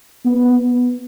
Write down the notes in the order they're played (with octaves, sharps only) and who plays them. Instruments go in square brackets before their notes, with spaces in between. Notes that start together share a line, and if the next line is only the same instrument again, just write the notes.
[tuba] B3